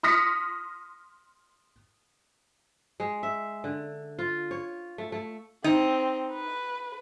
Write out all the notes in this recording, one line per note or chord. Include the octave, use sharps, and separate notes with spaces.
C6 D#6 F6 A#6 B6 C#7
G#3
E5
D3
F4
C#5
A3
A3
C4 D#4
B4